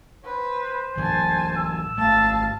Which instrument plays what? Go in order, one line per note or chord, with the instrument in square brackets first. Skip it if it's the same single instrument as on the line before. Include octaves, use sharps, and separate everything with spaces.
[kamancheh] B4 [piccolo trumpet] C5
[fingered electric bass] A2 E3 F#3 [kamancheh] G#5 A5
[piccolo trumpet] E6
[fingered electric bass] G#1 A3 [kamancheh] F5 A5